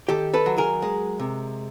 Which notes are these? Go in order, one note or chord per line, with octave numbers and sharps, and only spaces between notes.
D#3 G4 A4
A4 B4
F#3
G#4 A#4
G#3
C3